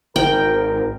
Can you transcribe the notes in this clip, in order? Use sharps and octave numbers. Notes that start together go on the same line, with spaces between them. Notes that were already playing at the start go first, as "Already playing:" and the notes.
G#1 A#4 G5